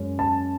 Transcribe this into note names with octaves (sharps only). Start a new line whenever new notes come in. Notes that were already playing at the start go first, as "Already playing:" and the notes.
Already playing: F#2 G#3 C#4
A5